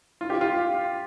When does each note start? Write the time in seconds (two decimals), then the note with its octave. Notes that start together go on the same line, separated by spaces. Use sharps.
0.21 F4
0.30 G4
0.41 F4